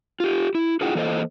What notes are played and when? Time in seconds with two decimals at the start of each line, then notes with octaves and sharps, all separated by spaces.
0.20 F4 G4
0.55 E4
0.81 D4 E4 F4 G#4 F#5 G5
0.95 E3 A#3 A4 C5 D#5